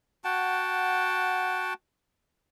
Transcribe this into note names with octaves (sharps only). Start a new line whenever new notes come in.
F#4 F#5 G5 A5